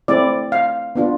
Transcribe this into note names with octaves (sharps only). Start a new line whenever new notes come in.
A3 C4 E4 D5
F5
B3 D4 F4